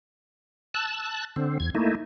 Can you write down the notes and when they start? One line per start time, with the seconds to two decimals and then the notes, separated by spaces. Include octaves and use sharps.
0.74 A5 E6 F#6
1.36 D3 C4
1.60 E2 G#6
1.75 A3 A#3 D#4 E4